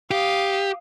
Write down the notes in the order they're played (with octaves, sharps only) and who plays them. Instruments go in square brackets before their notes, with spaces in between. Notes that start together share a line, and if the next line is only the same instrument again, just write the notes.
[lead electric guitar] G4 [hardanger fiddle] F5 D#6